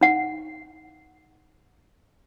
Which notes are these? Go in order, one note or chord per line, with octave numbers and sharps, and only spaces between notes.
D#4 F#5